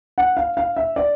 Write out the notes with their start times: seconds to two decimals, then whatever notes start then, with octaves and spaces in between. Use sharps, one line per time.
0.18 F#5
0.37 F5
0.57 F5
0.77 E5
0.96 D5